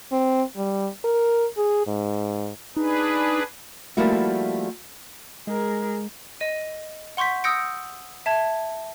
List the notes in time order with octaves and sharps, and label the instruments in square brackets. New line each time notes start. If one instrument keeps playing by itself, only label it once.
[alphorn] C4
G3
A#4
G#4
G#2
[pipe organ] D4 G#4 B4 [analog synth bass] D#4
[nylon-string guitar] F3 G3 A3 A#3 E4 F#4
[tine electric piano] G#3 [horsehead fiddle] G#4 A#4
[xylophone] D#5 D#7
F#5 C6 C#6 G6 B6
D#6 E6 G6 A#6 C#7 D7
E5 A5 G#6